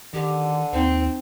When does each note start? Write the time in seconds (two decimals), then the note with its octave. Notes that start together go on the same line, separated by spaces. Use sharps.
0.13 D3 D#3 G4
0.73 D#2 C4 D#4